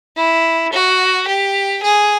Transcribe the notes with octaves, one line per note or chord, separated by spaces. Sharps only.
E4
F#4
G4
G#4